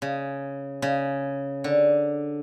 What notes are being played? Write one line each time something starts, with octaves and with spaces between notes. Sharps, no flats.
C#3
C#3
D3